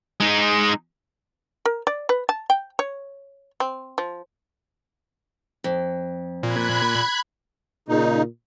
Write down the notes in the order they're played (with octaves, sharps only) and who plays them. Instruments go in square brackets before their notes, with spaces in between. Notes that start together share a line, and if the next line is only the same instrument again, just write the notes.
[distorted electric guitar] G#3 D#4
[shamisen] A#4
D5
B4
A5
G5
C#5
C4
F3
[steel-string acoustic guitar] F2
[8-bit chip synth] A#2 [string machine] B5 F#6 G#6
[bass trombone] A#2 [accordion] C#3 D#4